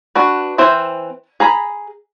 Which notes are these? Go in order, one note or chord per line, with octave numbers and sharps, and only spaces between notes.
D4 F#4 B4
E3 C4 C5 E5
G#4 A#5 B5